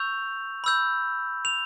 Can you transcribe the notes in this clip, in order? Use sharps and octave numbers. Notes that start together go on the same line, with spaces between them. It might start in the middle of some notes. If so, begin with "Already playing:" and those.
Already playing: C#6 E6 G6 F7
B5 E6 G6
F7